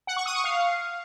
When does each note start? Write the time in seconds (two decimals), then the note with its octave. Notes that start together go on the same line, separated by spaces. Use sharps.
0.07 F#5
0.17 C#6
0.26 D#6
0.35 C#6
0.44 F5